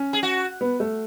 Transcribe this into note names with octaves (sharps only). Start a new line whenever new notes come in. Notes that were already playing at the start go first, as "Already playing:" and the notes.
Already playing: C#4
G#4
F#4
B3
A3